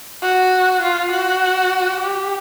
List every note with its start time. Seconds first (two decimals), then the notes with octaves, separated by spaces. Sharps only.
0.22 F#4
0.82 F4
1.11 F#4
2.00 G4